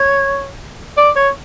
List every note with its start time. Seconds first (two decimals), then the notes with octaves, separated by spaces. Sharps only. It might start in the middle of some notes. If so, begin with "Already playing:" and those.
Already playing: C#5
0.97 D5
1.16 C#5